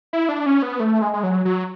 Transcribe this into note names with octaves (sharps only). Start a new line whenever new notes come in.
E4
D4
C#4
B3
A3
G#3
G#3
F#3
F#3